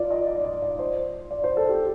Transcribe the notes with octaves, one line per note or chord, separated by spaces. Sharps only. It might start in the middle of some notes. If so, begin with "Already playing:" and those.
Already playing: F4 D5
D#5
D5
D5
D5
C5
D5
C5
A4
G4